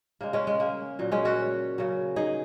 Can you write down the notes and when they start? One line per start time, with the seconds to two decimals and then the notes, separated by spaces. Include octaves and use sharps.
0.21 C#3 G#3 A#3
0.33 G#3 C#4
0.47 G#3
0.60 A#3
0.99 A#2 F#3
1.12 G#3 C#4
1.25 C#4 F#4
1.78 C#3 F#3
2.16 D#4 G#4